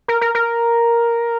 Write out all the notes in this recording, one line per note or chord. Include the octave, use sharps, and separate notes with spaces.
A#4
A#4
A#4